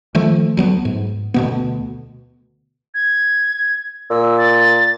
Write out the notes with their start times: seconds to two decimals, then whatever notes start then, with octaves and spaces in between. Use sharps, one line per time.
0.15 D#3 F3 A3
0.57 D2 F#3 B3
0.85 G#2
1.34 D2 B2 B3
2.94 G#6
4.10 A#2 E6
4.38 A6